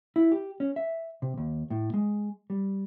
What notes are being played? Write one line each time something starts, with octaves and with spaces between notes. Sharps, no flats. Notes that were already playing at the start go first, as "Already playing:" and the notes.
E4
G4
C#4
E5
C3
D#2
A2
G#3
G3